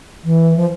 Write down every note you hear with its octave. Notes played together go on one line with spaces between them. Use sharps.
E3
F3